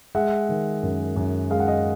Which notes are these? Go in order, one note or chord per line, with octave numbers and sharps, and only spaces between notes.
G#3 E5 F#5
D#3
F#2
F#2
G#3 F5
F#5
D#5 F5